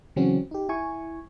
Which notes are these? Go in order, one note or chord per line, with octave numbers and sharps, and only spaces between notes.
C#3 E3 F#3 C4 C#4 F#4
D#4 G4
E4 G#5 C#6